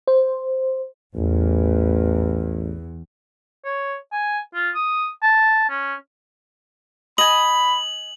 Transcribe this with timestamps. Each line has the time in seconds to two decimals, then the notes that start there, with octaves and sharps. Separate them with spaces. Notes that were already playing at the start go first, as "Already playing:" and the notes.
0.08 C5
1.15 A1 E2
3.65 C#5
4.12 G#5
4.54 F4
4.75 D#6
5.23 A5
5.69 C#4
7.18 D#5 G#5 B5 F#7